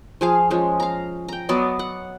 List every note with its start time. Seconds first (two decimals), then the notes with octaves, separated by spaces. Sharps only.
0.21 F3 G#4 F5
0.50 F3 G#3 C#4
0.80 F5 A#5
1.28 G5 A#5
1.49 F#3 B3 D5 D#5
1.79 F#5